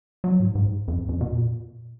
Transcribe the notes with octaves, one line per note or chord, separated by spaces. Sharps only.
F#3
G#2
G#2
F2
F2
B2
A#2